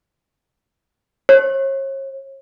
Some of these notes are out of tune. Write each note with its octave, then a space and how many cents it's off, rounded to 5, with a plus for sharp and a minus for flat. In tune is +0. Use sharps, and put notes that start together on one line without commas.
C#5 -40